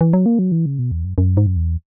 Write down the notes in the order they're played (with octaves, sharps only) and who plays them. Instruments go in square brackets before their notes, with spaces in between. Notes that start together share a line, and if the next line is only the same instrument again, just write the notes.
[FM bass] E3
F#3
A#3
F#3
E3
C#3
B2
E2
F#2
F#2
G#2
F#2
E2